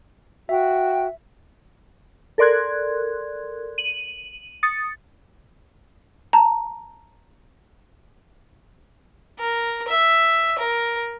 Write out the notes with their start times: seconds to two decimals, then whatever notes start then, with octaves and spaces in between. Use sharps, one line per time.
0.49 F#4 E5 G5
2.38 A4 A#4 D5 C6 F#6 G#6
3.78 D#7 F#7
4.63 D#6 A6 C#7
6.33 A5 A#5
9.39 A#4
9.88 E5
10.58 A#4